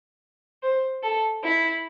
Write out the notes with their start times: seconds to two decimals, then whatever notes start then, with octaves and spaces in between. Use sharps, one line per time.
0.63 C5
1.03 A4
1.44 E4